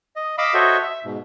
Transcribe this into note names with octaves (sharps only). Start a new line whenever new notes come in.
D#5
D#5 F5 B5 D6 E6
F#4 A4 C5 C#5 D#5 E5
E5
G#2 B2